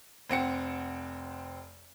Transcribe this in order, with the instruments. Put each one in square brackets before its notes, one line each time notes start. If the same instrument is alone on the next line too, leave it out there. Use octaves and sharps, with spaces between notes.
[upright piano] F1 C4 F#5 C#7